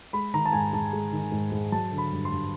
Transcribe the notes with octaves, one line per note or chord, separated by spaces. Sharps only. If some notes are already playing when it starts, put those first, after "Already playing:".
G#3 B5
D#3 A#5
A5
G#2 G#5
G#2 A5
G#3
D#3
G#2
G#2
F#3 A5
D3
B5
G2
C6
G2